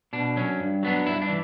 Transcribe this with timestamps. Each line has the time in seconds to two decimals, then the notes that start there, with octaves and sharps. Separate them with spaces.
0.13 B2 D4
0.36 F#3 C#4
0.60 G2
0.83 F#3 B3 D4
1.06 G2 E4
1.22 D4
1.29 E3